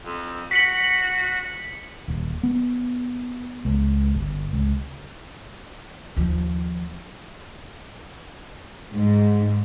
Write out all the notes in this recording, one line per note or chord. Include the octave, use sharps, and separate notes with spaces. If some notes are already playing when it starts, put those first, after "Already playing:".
F2
F#4 B6 C#7 F#7
D#1
B3
C#2
G1
C#2
D#2 F3
G#2